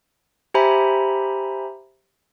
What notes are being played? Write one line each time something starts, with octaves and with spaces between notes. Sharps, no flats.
G4 C5 E5 G#5 A#5 B5